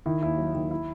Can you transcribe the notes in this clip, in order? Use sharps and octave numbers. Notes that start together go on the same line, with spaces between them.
D#3 E4
D#2 E4
F#3
D#3
E4